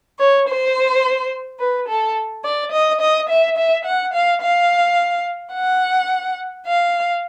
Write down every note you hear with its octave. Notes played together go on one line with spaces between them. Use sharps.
C#5
C5
B4
A4
D5
D#5
D#5
E5
E5
F#5
F5
F5
F#5
F5